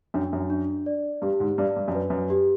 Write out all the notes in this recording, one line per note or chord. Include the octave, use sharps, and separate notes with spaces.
F#2 D4
F#2
D4
D5
G2 G4
G#2
G2 D5
G2
F#2
B4
F#2
G4